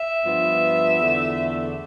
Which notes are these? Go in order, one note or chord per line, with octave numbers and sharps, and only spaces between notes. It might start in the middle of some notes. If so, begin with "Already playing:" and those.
Already playing: E5
G2 F3 B3
E2 D3 A3